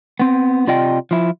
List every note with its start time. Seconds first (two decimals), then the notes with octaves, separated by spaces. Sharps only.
0.20 B3 C4
0.67 C3 F4 D5 D#5 G5
1.11 F3 E4